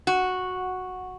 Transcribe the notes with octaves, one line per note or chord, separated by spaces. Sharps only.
F#4